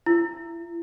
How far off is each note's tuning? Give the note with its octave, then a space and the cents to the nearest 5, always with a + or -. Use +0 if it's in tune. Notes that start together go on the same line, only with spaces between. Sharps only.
E4 +30